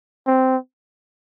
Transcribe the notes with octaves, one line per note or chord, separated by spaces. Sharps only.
C4